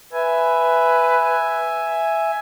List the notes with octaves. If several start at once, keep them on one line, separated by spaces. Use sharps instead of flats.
B4 E5 G#5